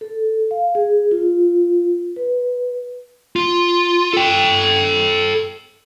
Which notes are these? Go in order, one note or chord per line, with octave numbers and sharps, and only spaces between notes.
A4
F5
G#4
F4
B4
F4
A4 G5